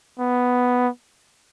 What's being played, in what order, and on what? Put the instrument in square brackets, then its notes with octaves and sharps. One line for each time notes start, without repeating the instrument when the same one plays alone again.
[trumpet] B3